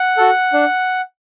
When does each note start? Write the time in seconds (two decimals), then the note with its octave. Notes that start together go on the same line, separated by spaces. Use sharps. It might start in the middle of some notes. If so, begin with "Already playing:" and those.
Already playing: F#5
0.17 F#4 A4
0.53 D4